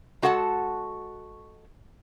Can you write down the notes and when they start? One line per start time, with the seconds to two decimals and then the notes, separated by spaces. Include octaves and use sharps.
0.22 G#3 F#4 A4 F#5 G#5 A5